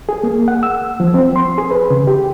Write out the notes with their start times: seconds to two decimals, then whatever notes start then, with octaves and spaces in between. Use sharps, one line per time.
0.09 G#4
0.23 A#3
0.48 F#5
0.63 E6
1.00 F3
1.14 C4
1.36 C6
1.58 G#4
1.71 B4
1.90 C#3
2.07 G4